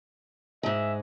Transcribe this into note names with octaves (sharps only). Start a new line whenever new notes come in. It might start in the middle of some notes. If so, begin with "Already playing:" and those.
G#2 G#3 E5